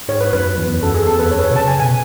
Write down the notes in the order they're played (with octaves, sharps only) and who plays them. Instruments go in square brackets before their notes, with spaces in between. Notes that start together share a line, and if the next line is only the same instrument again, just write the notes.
[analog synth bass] G#2 [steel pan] C#5
[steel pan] B4
[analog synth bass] F#2 [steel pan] B4
[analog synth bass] E2
[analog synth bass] F#2 [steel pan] A4
[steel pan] G#4
[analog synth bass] E2 [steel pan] A4
[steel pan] B4
[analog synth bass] F#2 [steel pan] C#5
[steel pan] B4
C#5
[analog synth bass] B2
[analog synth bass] C#3 [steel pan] A5
[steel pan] G#5
[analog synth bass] B2 [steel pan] G#5